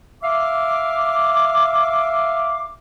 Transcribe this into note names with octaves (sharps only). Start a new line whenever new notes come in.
E5 F5 D6